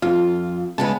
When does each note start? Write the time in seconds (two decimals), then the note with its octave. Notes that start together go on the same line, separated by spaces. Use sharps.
0.02 F2 F4
0.78 C#3 G#3 B3 A5